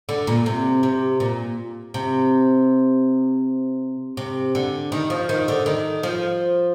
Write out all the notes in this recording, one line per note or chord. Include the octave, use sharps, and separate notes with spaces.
D3
A#2
C3
C3
A#2
C3
C3
D3
D#3
F3
D#3
D3
D#3
F3